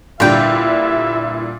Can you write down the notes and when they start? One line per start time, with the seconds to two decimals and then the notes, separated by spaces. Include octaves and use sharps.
0.20 A#2 D3 G3 E4 B4 E5 G5